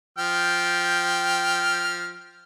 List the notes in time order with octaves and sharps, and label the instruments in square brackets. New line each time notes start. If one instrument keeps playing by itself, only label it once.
[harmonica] F3 G5 F6